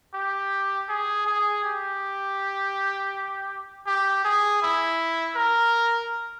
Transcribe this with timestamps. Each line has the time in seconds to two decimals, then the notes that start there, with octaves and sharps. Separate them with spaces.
0.14 G4
0.89 G#4
1.27 G#4
1.64 G4
3.87 G4
4.25 G#4
4.62 E4
5.36 A#4